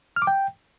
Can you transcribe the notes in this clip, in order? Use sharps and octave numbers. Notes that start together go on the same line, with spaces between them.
F6
D6
G5